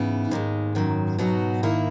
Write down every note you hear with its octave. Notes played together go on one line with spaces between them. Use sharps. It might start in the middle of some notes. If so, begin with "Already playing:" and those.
Already playing: G#2 C#3 E3 B3 E4
D#2 G#2 D#3 G#3
F#2 D#3 F#3
B2 F#3 B3 D#4 F#4
D#3 A#3 E4